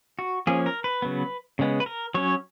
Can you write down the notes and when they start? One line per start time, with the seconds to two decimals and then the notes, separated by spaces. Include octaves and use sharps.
0.19 F#4
0.47 F3 A#3 C#4 G#4
0.66 A#4
0.84 B4
1.02 C#3 F#3 B3
1.59 C#3 G#3 B3
1.80 B4
1.86 A#4
2.14 F#3 C#4 C#5